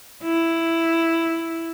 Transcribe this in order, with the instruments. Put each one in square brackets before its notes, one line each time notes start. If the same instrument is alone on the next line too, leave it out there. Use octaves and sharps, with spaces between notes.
[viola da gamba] E4